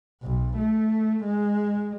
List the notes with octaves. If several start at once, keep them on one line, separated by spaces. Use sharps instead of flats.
B1
A3
G#3